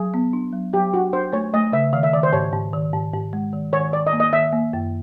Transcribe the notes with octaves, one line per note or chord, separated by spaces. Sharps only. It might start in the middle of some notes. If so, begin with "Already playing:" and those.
Already playing: F#3 G#4
B3
D4
F#3
F#3 G4
D4 F#4
D4 C5
A3 C#5
A3 D#5
C#3 E5
D#3 F5
E5
D#3 D5
C5
G#2 C#5
G#2
D#3
G#2
G#2
G#3
D#3
D#3 C#5
D#3 D5
D#5
A#3
D#5
D#3 E5
A#3
F#2